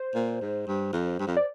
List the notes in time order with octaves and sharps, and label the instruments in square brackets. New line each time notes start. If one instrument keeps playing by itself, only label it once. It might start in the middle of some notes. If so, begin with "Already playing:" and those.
Already playing: [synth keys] C5
[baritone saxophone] A#2
G#2
G2
F2
G2
F2
[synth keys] D5